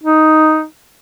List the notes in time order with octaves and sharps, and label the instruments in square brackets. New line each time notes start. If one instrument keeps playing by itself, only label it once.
[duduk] D#4